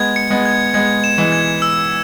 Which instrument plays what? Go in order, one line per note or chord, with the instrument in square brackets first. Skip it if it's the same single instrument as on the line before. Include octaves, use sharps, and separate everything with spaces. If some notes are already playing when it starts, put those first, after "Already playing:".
Already playing: [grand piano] G#3 B3 [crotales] G#6
[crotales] C#7
[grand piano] G#3 B3
[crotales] G#6
[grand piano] G#3 B3 [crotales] G#6
[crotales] E7
[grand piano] E3 G#3
[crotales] G#6
E6